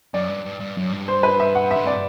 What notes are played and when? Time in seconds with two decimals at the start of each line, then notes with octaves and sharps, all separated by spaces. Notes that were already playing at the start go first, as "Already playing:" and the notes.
0.14 F#2 D5
0.29 G2
0.46 G2
0.60 G2
0.77 F#2
0.92 G2
1.08 C5
1.23 B4
1.40 E5
1.55 F#5
1.71 E5
1.76 D3
1.85 C3 D5